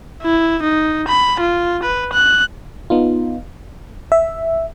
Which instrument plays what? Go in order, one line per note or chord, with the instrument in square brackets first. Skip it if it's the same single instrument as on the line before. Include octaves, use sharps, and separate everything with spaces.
[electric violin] E4
D#4
B5
F4
B4
F#6
[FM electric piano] B3 D#4 F4
E5